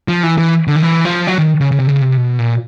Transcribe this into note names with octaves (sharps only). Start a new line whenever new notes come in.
F3
E3
E3
D3
D#3
E3
F3
F#3
D#3
C#3
C#3
C3
C#3
C3
B2
A#2